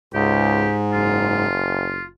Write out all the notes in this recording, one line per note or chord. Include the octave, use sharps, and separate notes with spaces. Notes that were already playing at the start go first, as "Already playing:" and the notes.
C#2 G#2 G4
F#1 F4